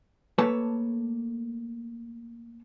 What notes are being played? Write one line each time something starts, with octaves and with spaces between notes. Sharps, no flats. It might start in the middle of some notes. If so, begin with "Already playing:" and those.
A3 A#3 A4 B4 C#5 A5